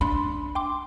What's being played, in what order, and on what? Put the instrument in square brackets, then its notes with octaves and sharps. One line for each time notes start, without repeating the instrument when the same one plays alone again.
[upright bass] D4 [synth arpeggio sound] B5 C6
[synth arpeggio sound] G5 C6 D6